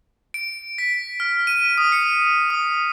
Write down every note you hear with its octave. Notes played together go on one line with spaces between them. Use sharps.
D7
B6
F6
D#7
D#6
C#7
D#6